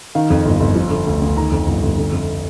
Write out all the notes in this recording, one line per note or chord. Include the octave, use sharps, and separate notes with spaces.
D#3 F5
F2
G1
G1
F3
D3
D2
D2
D#3 A#5
F2
G1
G1
D3
F2